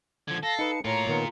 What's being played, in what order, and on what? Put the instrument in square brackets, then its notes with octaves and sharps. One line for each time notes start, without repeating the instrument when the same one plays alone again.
[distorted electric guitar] D3 F3 [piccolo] G#6
[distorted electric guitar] A4 [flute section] F5 A5 [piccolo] A#6
[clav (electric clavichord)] D#4 B4 D#5 [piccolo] C#7
[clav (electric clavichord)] A2 [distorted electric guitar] F4 A#4 [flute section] C#5 A#5 [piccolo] C#7
[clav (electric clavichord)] A#2 D#3 B3